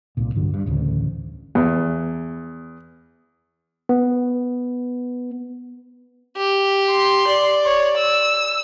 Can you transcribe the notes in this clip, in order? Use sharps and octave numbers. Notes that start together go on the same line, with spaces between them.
C2 A#2
A1 G2 D3 F#3
G2
A1 D2 C#3
E2
B3
G4
C6
D5
C#5
E6